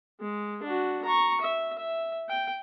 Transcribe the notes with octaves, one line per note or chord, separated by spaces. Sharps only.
G#3
D4 F#4
A#5 C#6
E5
E5
G5